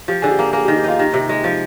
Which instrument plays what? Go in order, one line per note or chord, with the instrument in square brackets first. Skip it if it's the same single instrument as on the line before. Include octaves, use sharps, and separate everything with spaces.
[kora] F3 [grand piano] G4
[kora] D3 [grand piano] G#4
[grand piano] G4
[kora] A#3
[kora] A#3 [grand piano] G#4
[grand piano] G4
[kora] D#3
[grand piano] G4
[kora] D#4 [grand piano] F4
[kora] D#3 [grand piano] G4
[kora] C3
G#3
F3